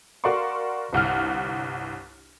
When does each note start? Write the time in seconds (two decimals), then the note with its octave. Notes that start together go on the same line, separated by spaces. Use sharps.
0.24 F#4 A#4 D5 F5 C6 C#6
0.93 G1 C2 F#5 F6